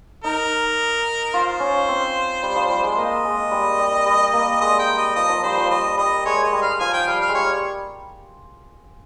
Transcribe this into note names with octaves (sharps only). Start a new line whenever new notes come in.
D#4 A#4
F4 C5
C#4
C4
G3
F3
G3
G#3
A#3 D#5
G#3
G3
G3
G3
A#3
G#3 D#5
G5
G3
D#5
F3 D#5
F3
G3 C5
F3
G3 D#5
G3 D#5
G#3 C#5
D#5
G3
F5
F3 G#5
G5
G3 F5
F5
G#3
G3 C#5